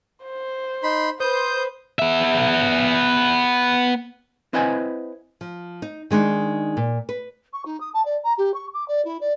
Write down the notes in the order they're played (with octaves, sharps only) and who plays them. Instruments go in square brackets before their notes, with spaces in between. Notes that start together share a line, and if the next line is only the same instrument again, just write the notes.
[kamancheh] C5
[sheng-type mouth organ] D#4 B5 C6
[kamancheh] B4 [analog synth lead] C5 [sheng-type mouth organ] D#6 G6
[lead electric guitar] B3 E5
[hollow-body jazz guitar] C4 E4 B4 D#5 F#5 G#5
[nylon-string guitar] F3
D#4
D#3 G#3 D4 D#4
A#2
B4
[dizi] C#6
D#4
D#6
A5
D5
A#5
G4
C#6
D6
D5
E4
D5